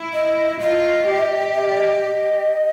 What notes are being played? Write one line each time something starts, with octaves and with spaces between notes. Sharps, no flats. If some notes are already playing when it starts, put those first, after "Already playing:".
Already playing: E4
D#5
F4 D#5
G4
E5
D#5
D5
D#5